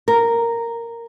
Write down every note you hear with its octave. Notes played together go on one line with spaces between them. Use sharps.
A#4